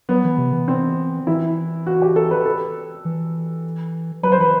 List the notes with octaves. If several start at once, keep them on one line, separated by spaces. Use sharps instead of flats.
F#3 B3
E3
C3
E3
C4
E3 E4
F#4
G4
A4
B4
A4
E3
F#3 B4
C5
E3 B4